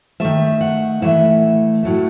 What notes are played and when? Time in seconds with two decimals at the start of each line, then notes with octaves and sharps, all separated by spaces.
0.20 D#3 A3 E5
0.61 F#5
1.02 A2 E3 A3 E5
1.83 A2 F#3 A3